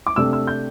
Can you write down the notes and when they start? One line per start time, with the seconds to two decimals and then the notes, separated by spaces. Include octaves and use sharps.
0.07 D6
0.16 C3 A3 D4 E6
0.33 E6
0.47 G6